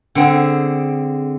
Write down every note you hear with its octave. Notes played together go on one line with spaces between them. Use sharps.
D3 C4 G#4